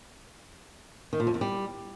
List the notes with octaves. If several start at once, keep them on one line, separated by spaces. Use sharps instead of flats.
D#3
A#2
F2
E2
G3